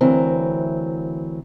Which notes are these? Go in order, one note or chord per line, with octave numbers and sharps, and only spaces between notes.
D2 E3 F#3 C4 A#4